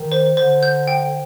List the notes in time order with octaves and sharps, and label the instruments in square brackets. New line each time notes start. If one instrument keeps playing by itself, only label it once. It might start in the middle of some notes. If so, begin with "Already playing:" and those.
Already playing: [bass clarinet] D#3
[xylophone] C5
[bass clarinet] D3 [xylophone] C5
[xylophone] G6
G5